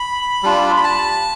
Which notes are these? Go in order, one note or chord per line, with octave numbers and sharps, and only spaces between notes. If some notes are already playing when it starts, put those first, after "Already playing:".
Already playing: B5
G3 D4 F4
B5
A5